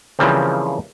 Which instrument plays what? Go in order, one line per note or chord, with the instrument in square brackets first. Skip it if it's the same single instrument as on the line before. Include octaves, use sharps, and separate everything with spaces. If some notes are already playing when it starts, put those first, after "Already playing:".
[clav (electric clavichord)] C#3 E3 F3 G3 A#3 C4